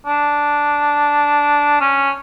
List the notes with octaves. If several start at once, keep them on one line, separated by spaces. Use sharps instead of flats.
D4
C#4